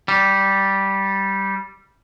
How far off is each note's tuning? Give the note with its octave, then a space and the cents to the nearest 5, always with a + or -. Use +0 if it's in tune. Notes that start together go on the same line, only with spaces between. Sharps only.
G3 -10